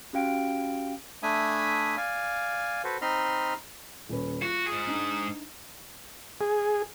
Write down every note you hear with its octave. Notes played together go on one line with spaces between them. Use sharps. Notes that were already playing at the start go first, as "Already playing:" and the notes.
C#4 F#4 G4 F5 G5 D7
A3 D4 E5 G#5 B5 D#6
D5 F5 G#5
F#4 A4 B4 C5
C4 D#4 D#5 B5 C6 F6
D#1 C#4 B4
F4 F#4
G#2 G#4
D4 D#4
G#4